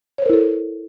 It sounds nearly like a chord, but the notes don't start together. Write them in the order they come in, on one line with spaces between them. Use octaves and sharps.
C#5 C5 A#4 E4 A4